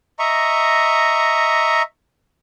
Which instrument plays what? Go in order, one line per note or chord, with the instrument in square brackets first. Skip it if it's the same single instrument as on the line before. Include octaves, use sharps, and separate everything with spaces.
[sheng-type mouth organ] D#5 E5 A#5 C#6